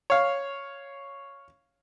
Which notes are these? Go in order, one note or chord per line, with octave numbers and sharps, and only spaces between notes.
C#5 F5